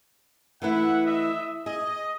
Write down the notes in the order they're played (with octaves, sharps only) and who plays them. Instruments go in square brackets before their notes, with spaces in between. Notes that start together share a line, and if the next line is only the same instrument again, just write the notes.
[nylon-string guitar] E3 A3 E4 [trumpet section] B4 E5 F#5
[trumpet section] D#5 E5
[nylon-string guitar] G#4 [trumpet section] D#5